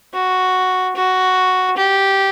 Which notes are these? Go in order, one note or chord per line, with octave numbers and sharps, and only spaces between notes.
F#4
F#4
G4